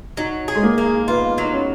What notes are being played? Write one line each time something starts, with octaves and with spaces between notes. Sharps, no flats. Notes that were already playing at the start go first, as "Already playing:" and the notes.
F#3 D#4
G#4
G#3
A#3
A#3
B3 F4
F#3
D#4
C#4